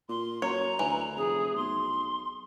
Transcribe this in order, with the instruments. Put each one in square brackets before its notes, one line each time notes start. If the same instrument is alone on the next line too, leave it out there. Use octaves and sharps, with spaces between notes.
[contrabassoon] A#2 [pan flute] C6
[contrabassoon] F#2 [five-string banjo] C#5 [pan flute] A#5
[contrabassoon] D2 [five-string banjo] E3
[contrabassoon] F1 [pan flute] G#4
[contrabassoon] B1 [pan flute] C6